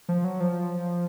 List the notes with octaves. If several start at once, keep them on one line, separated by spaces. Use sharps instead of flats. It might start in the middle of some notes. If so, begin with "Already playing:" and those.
F3
F#3
F3